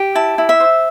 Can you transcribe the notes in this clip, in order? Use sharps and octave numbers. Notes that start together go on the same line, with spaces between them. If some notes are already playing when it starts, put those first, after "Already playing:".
Already playing: G4
E4 A5
E4
E5
C5